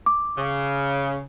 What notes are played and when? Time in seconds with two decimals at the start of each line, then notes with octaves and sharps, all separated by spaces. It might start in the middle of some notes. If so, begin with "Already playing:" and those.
0.06 D6
0.38 C#3